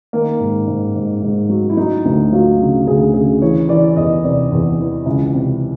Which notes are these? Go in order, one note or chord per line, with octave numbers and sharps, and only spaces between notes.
D#3 A#3
G#2
G#2
G#2
G#2
F#3
E4
F#3 D#4
D2
F#3 F4
C#3
D2 G#4
C#3 G#4
E3 C#5
E3 D5
D5
E2 D#5
C3 D5
E2
E3
C#2
C3